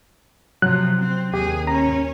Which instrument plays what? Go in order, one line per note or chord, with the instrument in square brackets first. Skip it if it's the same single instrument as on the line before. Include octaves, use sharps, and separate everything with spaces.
[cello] C3 F3 [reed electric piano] F#3 [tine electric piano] F#6
[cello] C4
[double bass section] D#2 [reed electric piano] G4 [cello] G#4
[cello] C#4 C#5 [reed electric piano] A#5